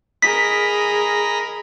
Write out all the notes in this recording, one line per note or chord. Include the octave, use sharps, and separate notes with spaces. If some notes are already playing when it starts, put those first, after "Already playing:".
G#4 A#4 D#5 A#5 B5 B6